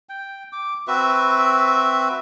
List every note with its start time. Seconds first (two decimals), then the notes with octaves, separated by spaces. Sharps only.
0.09 G5
0.53 D6
0.88 C4 F#4 B4 E5